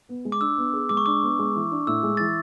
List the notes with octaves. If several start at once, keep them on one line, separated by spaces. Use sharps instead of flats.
B3
G#3
D6
D4 E6
B3
G#4
G#3 D6
C#6
D4 D6
B3
G#3
E3
D4
A2 E6
G#3
E3 A6